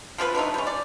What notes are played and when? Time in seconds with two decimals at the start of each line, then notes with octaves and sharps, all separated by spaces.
0.18 F3 F4 G#4 B4
0.35 D3 E3 A3 D#4
0.54 G3 C#4
0.67 D5